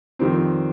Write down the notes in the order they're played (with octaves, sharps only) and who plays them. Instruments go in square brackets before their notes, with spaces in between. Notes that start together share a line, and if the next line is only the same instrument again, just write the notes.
[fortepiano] F2 D#3 G3 C4